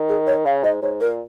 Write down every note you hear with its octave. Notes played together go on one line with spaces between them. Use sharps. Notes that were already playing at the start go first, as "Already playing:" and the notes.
Already playing: D#3
G#4
C#5
C#3 F5
G#2 D#5
G#2 C#5
A#2 A#4